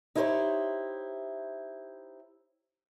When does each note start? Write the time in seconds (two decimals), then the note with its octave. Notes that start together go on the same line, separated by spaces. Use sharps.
0.15 D#4 E4 G4 A#4 C5 C#5